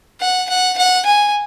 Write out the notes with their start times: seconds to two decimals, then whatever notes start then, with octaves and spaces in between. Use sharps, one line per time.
0.21 F#5
0.49 F#5
0.78 F#5
1.06 G#5